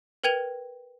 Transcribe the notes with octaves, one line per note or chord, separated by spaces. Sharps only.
A#4 B4 G5 G#6 D#7 F7